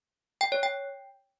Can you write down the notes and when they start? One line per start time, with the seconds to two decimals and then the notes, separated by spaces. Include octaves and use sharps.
0.41 G5
0.52 C#5
0.63 G5